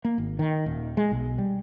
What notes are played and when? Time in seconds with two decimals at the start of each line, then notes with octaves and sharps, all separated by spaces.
0.05 A#3
0.18 G#1
0.39 D#3
0.66 D#1
0.97 G#3
1.11 B1
1.38 G3